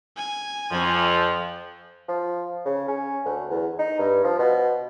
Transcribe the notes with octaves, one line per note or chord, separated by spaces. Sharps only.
G#5
F2 F3
F3
C#3
C#4
D2
E2
D#4
G2
F3
B2